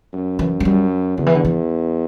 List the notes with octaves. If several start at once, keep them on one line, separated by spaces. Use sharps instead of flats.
F#2
E3
F#3
F#2 G3
E2 D3
E3
D3
E3